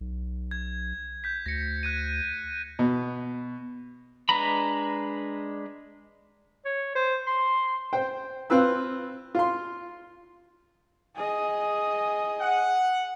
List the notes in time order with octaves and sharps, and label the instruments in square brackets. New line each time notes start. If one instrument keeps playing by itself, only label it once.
[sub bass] B1
[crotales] G#6
G6 B6
[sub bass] D2 [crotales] A#6 C#7
[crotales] F#6 G#6 D#7
[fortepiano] B2
[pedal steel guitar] G#3 D4 B4 A#5 B5
[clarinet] C#5
C5
C6
[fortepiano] C5 G5
C4 F4 B4 E6
F4 C6
[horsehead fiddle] G#4 D#5
[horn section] F#5